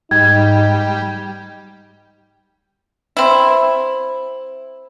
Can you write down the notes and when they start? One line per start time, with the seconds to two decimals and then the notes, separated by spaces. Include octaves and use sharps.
0.11 G#2 G3 D#4 G#6
3.17 C4 E4